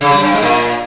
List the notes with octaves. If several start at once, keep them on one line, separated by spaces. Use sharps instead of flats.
C#3
G3
G2
G#2
A#2